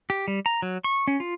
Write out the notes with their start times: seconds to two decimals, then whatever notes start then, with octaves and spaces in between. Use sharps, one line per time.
0.10 G4
0.28 G3
0.46 A#5
0.62 F#3
0.84 C#6
1.08 C#4
1.20 F4